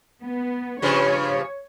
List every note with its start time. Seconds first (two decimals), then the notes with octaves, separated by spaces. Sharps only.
0.24 B3
0.82 G2 C#3 F3 C#5